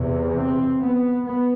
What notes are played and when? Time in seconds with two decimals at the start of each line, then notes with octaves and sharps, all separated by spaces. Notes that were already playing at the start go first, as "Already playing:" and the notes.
Already playing: E2 C3
0.36 C4
0.81 B3
1.25 B3